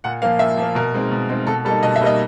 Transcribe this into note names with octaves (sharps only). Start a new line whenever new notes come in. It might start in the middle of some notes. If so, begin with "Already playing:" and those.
A#2 F#5
F3 A#3 F5
A#2 E5
F3 A#3
B2 A#4
G#3 C4 D#4
B2
G#3 C4 D#4
B2 A4
G3 A#3 D#4 A4
B2 D#5
E5
G3 A#3 D#4 D#5